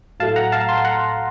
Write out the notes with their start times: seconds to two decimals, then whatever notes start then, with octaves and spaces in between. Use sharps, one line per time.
0.20 A2 F#3 A3 F5 A5
0.36 F#5 A#5
0.52 F5 A5
0.69 A5 C6
0.85 F#5 A#5